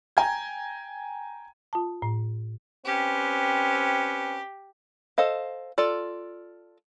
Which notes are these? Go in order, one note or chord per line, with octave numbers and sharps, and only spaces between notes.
G5 G#5 A#5 G#6
F4 A5
A2
C4 C#4 G4 B4
A4 C5 D#5 F5
F4 A4 D5